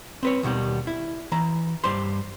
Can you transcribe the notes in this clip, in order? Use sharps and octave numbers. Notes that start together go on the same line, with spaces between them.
C4 B4 C#5
D#2 B2 D#3 G3
E4
E3 A#5
G2 G3 C5 C6